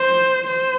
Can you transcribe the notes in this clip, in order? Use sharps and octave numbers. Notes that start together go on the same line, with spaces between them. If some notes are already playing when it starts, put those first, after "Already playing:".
Already playing: C5
C5